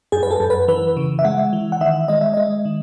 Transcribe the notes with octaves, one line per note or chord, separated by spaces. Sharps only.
F#2 G#4
B4
A4
F#2
B4
E3 B4
C#3
E5
G#3 F#5
E3
F#5
D#3 E5
G#3 D#5
E5
G#3 D#5
D#3